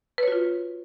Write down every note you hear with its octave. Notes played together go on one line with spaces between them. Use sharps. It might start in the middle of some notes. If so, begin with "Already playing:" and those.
F4 F#4 B4 C#5